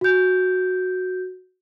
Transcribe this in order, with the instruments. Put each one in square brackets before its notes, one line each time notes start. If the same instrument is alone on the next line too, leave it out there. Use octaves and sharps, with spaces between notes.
[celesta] F#4 G6